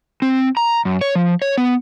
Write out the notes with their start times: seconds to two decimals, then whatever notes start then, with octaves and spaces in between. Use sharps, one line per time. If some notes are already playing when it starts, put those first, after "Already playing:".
0.22 C4
0.57 A#5
0.85 F#2
1.01 C#5
1.15 F3
1.42 C#5
1.58 B3